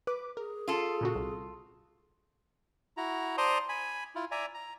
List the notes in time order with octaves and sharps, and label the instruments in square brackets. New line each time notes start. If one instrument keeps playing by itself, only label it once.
[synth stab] B4 D6
[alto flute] G#4 [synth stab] A#4
[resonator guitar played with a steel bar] F4 A4
[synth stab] A#2 C#3 F#4
C2
[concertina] E4 F#4 A#5
C5 D5 A5 A#5 C6 D#6
G#5 B5
E4 F4
D5 E5 G#5 A#5
A#5